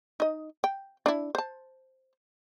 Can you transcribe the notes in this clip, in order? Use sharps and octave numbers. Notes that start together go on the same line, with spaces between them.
D#4 D#5
G5
D4 E4
C5 A5